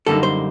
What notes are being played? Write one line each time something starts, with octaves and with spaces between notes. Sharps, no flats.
F#2 D3 G3 A#3 D#4 A4
C5